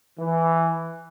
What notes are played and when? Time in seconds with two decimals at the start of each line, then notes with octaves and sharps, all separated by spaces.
0.18 E3